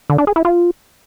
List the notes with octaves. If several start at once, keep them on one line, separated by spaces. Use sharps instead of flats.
D3
D4
G#4
E4
F4